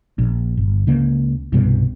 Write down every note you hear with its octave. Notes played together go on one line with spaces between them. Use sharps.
A#1
G1
C#2 C#3 A#3
C2 G2 B2